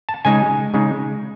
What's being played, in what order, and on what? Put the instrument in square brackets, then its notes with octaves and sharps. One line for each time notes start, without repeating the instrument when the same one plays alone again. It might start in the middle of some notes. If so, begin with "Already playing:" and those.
[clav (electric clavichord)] A5
C#3 G#3 D#4 G#5
C#3 G#3 D#4